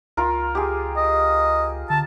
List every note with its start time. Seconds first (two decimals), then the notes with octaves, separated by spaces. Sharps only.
0.17 C#2 F4 A#4
0.55 G4 G#4
0.97 D#5
1.90 D3 A5